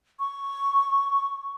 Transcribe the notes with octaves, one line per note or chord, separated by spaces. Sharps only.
C#6